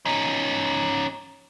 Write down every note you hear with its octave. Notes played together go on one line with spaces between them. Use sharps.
C#4 D#4